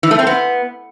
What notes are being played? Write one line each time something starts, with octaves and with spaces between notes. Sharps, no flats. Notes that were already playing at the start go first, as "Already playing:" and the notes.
E3
A3
C4
B3